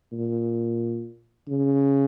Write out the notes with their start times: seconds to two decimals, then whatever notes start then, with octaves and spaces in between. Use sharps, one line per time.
0.12 A#2
1.48 C#3